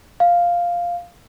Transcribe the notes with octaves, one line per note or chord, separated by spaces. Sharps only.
F5